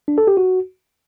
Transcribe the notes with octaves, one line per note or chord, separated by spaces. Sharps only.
D4
A4
G4
F#4